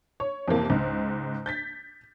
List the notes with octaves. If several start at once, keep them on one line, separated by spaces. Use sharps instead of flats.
C#5
F2 C3 E3 A#3
C#2 G#2
G6 A6 B6